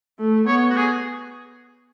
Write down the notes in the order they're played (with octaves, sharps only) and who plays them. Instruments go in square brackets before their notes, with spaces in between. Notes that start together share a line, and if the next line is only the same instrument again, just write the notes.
[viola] A3
[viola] B3 [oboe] C#5
[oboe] F#4
G#4